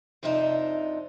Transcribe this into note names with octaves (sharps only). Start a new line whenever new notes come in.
F2 C3 F3 D4 D#4 E5